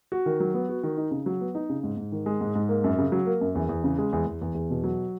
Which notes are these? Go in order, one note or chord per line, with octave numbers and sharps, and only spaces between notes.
F#4
D#3
F#3
B3
F#4
D#3
D#4
C#3
F#3
B3
D#4
C#3
G#2
G#2
D#3
G#3
G#2
G#2
A#3
F#2
C#3
F#3
A#3
F#2
E2
E2
C#3
G#3
E2
E2
E2
E2
B2
F#3